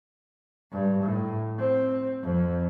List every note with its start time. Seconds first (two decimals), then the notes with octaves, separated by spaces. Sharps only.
0.72 G2
1.02 A2
1.58 C4
2.22 F2